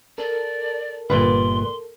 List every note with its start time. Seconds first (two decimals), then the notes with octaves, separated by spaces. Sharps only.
0.18 A4 A#4 D5
1.10 G1 A#2 B4 D5 C6